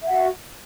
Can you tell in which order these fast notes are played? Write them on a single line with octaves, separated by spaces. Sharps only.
E5 F#5 F#4